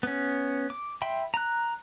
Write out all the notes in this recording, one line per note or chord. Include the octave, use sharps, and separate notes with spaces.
B3 C#4
D6
E5 G5 B5 C6
A#5 F#6